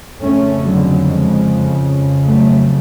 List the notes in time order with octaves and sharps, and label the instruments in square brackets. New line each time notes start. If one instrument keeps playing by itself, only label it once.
[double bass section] F2 C#3 A3 C#4
D3 F#3
F3 G#3
F#3 A3